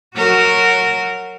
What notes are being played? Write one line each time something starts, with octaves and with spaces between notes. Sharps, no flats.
F#3 F#4 A#4